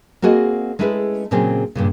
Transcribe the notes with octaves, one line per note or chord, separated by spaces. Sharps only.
A#3 C4 F#4 G#4 D#5
G#3 A3 C#4 E4 G#4 B4
A#2 C#3 F#3 C4 C#4 G#4
G2 A#2 C#3